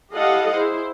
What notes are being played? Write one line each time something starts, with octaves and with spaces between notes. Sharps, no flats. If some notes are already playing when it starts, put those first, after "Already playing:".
E4 G4 A4 D#5 F5 F#5
E4 G#4 C5